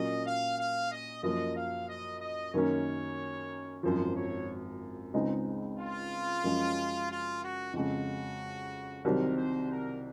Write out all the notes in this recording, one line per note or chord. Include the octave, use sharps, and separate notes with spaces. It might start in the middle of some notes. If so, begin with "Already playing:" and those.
Already playing: A#2 F#3 A#3 C#4 D#5
F5
F5
D#5
F#2 F3 A#3 D#5
F5
D#5
D#5
F#2 D#3 A#3 C#4 C#5
G#1 F#2 F3 C5
C#5
C#2 C#3 G#3 C4 D#4
F4
F#2 F3 G#3 C#4
F4
F#4
F2 C#3 G#3 F#4
C2 C3 D#3 F#3 C4 A#4
C5
A#4